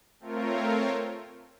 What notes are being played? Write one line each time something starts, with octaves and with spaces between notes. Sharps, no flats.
A3 C4 F4 A#4 C#5